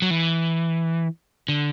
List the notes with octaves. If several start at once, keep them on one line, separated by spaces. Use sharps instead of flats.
F#3
E3
D3